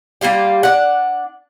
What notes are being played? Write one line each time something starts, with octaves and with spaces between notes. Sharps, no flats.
G3 A#3 F4 G4
D4 F#5